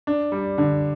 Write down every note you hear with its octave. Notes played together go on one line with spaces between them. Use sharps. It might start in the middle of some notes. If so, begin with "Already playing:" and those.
D4
G3
D3